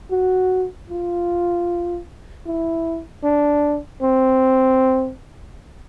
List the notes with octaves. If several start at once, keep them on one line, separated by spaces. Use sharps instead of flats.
F#4
F4
E4
D4
C4